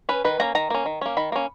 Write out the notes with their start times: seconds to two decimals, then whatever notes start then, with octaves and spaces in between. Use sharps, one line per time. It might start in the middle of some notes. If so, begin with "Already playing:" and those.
0.09 C#4 B4
0.24 D#3 B4
0.40 A#3 C#4 A#5
0.55 D#3 A#5
0.70 A#3 C#4
0.86 D#3
1.01 A#3 C#4
1.17 D#3 B5
1.32 A#3 C#4